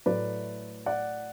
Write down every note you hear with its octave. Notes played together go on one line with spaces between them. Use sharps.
A2 F#3 A3 B4 D5
D5 F#5